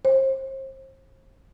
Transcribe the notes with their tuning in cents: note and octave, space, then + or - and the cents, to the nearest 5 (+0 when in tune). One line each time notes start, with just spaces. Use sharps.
C5 +35